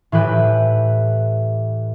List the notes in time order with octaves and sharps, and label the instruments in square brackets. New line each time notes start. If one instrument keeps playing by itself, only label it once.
[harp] A2 E3 G4 B4